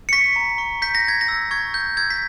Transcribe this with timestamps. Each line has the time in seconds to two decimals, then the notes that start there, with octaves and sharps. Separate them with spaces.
0.09 C#7
0.13 C#6 B6
0.36 A#5
0.58 C#6
0.82 G6 B6
0.95 A#6
1.05 G6 G#6
1.21 A#6
1.28 E6
1.51 C#6 G#6
1.74 G6
1.97 E6 G#6
2.10 B6